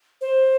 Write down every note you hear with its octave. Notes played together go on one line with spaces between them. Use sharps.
C5